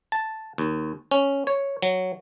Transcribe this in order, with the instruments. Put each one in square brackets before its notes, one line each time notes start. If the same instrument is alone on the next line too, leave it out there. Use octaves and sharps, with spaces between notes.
[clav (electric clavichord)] A5
D#2
C#4
C#5
F#3